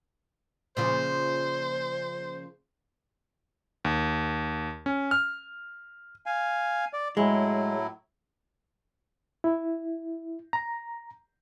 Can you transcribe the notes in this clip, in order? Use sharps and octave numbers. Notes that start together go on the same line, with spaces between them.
A#2 C#3 F3 C5
D#2
C#4
F6
F5 G#5
D5
A2 F#3 G#3 E4
E4
A#5